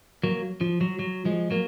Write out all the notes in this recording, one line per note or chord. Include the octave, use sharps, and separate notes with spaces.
F#3 A#3
F3
F#3
F#3
F3 G#3
F#3 A#3